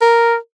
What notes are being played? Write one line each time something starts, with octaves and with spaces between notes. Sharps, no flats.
A#4